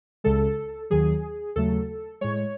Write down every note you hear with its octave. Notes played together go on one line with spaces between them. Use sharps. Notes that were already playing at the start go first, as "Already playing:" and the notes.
C#2 C#3 G#3 A4
D#2 D#3 F#3 G#4
D#2 C#3 F#3 A3 A4
A2 G#3 C#5